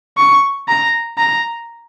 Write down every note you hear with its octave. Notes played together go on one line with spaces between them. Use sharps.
C#6
A#5
A#5